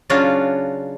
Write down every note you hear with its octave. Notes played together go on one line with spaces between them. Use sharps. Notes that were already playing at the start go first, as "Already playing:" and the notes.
C#3 F#3 C#4 D4 F4 F#4